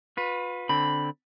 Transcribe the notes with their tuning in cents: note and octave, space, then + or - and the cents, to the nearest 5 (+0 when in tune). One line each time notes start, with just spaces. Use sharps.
F4 +40 B4 +0
D3 +0 C4 +0 B5 +0